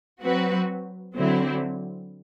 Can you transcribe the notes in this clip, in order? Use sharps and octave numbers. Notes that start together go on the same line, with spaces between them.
F#3 C4 F#4 B4
D3 F#3 C4 E4